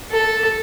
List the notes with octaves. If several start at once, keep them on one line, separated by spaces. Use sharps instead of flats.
A4